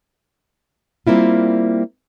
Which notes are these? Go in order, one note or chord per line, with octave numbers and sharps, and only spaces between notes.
G3 A#3 C4 E4 F4